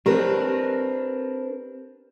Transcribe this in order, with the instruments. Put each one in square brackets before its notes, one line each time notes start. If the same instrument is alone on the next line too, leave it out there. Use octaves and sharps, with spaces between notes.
[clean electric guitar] C4 D4 [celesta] G4 [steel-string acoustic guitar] A#4 B4